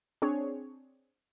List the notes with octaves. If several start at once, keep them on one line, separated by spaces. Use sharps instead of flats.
C4 D4 G#4 C#5